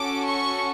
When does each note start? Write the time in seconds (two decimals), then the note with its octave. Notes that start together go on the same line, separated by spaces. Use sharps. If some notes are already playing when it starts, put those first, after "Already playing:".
Already playing: C#4 F#4 A4 D6
0.27 C#6